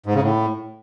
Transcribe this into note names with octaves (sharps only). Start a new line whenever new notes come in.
G#2
C#3
A2